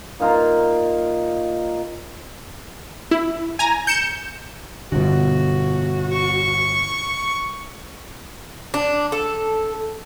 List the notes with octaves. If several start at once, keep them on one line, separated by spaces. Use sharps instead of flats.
A#2 D#4 F4 A#5
E4
G#5 A#5
G6 C#7 E7
G1 B2 D3 F#4
C#6
D4
A4